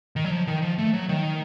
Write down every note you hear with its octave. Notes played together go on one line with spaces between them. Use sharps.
D#3
F#3
F3
D#3
F3
A3
F#3
D#3